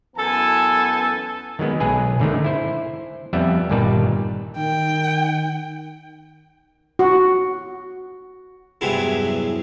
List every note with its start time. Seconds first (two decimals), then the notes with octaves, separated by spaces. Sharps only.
0.16 F#2 E3 B3 A4 G#5 A5
1.59 D#3 F#3 G#3 B3
1.80 B1 G#3 G#4 B4 G#5
2.19 G#2 D3 D#3 A3
2.44 E4 C5
3.33 F2 G3 B3 E5
3.70 G1 A#2 D#3 G3 B4 A5
4.57 D#3 G5
6.99 F#4
8.81 E2 G2 C3 F#3 G#3 E4